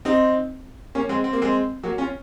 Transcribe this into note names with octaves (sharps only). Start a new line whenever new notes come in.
C4 D#4
A#3 C#4
G#3 C4
C4
A#3
G#3 C4
F#3 A#3
C#4 F4